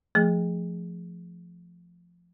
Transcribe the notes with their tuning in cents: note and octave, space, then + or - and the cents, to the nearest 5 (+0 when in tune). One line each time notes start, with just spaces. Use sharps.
F3 +0 A3 +0 G#4 +0